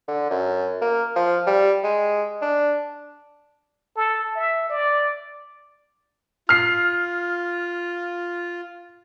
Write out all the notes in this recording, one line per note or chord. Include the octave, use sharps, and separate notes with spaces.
D3
F#2
A#3
F3
G3
G#3
D4
A4
E5
D5
F4 F6 C7